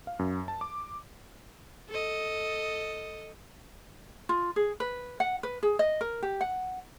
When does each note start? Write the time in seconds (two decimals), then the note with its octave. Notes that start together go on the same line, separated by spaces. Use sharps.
0.07 F5
0.19 F#2
0.48 A5
0.61 D6
1.90 A4 D#5
4.29 F4
4.56 G#4
4.80 B4
5.20 F#5
5.43 B4
5.63 G#4
5.79 D#5
6.01 A#4
6.22 G4
6.41 F#5